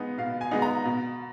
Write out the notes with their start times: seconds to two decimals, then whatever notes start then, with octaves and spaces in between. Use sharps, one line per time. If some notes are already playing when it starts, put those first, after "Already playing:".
Already playing: G#3 B3 D#4
0.18 B2 F5
0.41 G#5
0.51 G#3 B3 D#4
0.62 A#5
0.85 B2